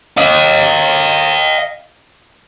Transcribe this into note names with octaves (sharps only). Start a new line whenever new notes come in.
D#5 F5